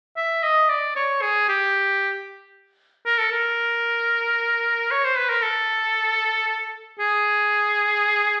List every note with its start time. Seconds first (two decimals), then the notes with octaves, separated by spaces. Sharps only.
0.17 E5
0.43 D#5
0.69 D5
0.96 C#5
1.22 G#4
1.49 G4
3.06 A#4
3.18 A4
3.32 A#4
4.91 C#5
5.04 C5
5.17 B4
5.30 A#4
5.42 A4
6.99 G#4